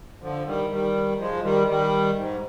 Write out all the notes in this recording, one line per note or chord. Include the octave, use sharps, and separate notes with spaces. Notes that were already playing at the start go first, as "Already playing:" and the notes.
D3 F3
D#3 G3
D#3 G3
F3 G#3
D#3 G3
D#3 G3
G#2